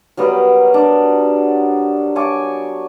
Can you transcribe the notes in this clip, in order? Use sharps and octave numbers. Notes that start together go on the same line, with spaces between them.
F#3 G3 B3 A#4
D4
C#5 G#5 A5 D6